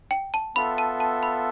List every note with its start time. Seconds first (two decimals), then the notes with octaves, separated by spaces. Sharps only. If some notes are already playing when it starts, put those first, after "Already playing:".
0.11 G5
0.34 A5
0.55 B3 F4 A4 E5 B5
0.78 A5
1.00 A5
1.23 B5